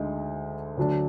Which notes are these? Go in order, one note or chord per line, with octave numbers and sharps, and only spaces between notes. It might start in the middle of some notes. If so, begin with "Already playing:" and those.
Already playing: D2 D3 G#3 D#4
D2 D3 F#3 D4